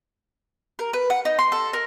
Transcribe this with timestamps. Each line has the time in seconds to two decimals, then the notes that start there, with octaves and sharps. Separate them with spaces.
0.79 A#4
0.93 B4
1.10 F#5
1.25 D#4
1.39 C6
1.52 A4
1.73 A#4